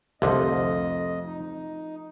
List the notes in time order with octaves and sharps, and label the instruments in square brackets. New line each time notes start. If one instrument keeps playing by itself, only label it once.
[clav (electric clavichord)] C2 D3 [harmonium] F2 D#5 [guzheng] F3 A3 F4
[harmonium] D#4